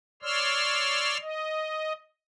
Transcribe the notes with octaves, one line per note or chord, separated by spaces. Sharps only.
C#5 D5 C6 E6 F6
D#5